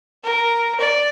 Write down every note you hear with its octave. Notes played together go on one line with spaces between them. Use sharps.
A#4
D5